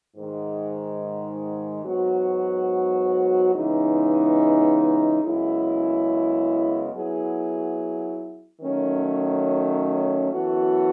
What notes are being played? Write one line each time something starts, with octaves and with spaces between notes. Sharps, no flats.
G#2 D#3 G#3
G#2 F#3 B3 F#4
C#3 E3 G#3 B3 D#4
F#2 C#3 G#3 B3 E4
F#3 B3 E4 G#4
D#3 F#3 A3 C#4
F#2 E3 B3 F#4 A4